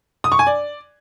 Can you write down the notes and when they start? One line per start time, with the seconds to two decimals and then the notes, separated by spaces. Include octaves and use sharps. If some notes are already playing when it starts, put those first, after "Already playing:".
0.24 D#6
0.32 C#6
0.39 G#5
0.47 D5